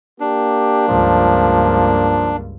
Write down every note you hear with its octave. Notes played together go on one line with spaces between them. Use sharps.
A#3 D4 G4
C#2 G2 F3